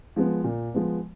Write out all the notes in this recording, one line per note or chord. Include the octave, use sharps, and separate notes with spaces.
F3 G#3 B3
A#2
F3 G#3 B3